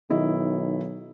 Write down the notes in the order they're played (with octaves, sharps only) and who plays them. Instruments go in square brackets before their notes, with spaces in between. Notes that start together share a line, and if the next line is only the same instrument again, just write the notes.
[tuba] B1 [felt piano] D#3 E4 D#5